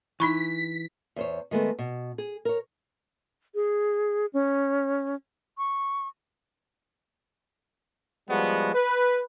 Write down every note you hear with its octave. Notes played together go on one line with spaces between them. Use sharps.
E3 D#4 B5 C#6 B6
E2 C5 C#5
D#3 G#3 A3 B3
B2
G#4
A#4 C#5
G#4
C#4
C#6
F3 G3 G#3 B3 F#4
B4